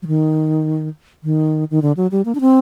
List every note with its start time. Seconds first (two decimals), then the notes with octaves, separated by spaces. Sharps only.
0.02 F#3
0.07 D#3
1.24 D#3
1.71 D#3
1.82 D3
1.97 F#3
2.11 G3
2.25 A#3
2.35 D4
2.41 C4